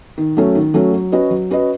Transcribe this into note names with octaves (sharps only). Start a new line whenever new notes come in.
D#3
F#3 A3 C#4
D#3
F#3 A3 C#4
F#3
C#4 F#4 B4 D#5
F#3
C#4 F#4 B4 D#5